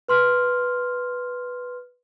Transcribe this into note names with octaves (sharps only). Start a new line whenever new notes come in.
B4 C6 F6